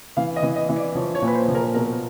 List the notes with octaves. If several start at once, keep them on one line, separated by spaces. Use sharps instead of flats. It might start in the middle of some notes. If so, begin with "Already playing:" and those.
E3 F5
D#5
E3
D#5
E3
D5
F3 C#5
C#5
A#2
B4
C5
F3
A#4
B2 A#4